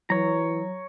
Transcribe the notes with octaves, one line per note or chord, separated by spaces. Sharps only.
E3 F#3 C#5 A#5